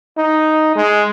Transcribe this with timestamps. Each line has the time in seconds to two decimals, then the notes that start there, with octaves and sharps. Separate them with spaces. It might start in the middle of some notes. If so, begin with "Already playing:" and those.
0.18 D#4
0.76 G#3